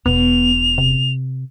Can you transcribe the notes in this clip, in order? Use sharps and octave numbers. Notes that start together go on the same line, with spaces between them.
E1 B2 B3 F7
C3